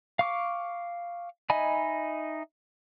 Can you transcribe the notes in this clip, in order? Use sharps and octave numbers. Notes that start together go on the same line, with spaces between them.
F5 C#6 D6
D#4 D#5 E5 G#5 B5